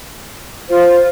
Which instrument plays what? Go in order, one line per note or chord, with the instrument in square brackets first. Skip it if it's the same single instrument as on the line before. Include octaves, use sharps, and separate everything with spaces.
[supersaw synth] F4 [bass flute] C5